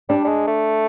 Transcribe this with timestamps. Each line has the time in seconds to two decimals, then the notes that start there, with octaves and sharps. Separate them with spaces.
0.09 G3 D4
0.24 G3
0.28 G#3
0.47 A3